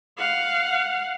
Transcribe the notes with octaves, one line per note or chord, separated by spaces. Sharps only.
F5 F#5